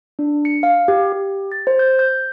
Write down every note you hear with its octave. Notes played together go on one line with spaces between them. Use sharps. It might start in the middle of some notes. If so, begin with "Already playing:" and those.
D4
C#7
F5
G4
G4
A6
C5
G6
G6